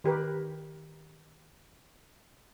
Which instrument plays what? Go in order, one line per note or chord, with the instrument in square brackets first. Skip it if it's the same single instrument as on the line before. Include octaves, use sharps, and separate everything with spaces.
[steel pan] D#3 G4 A#4 B4